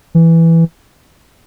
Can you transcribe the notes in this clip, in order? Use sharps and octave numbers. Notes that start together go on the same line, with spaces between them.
E3